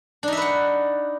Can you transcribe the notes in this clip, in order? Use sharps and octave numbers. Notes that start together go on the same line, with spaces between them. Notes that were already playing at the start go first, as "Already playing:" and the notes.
D4 D#4 B4 E5 F#5